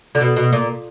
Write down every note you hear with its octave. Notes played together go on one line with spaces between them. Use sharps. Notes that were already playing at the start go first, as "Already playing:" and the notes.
D3
B2
B2
A#2